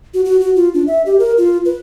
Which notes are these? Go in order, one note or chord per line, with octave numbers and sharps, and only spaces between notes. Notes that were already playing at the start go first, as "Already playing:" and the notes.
F#4
F#4
F#4
F4
D4
E5
G4
A#4
F4
B4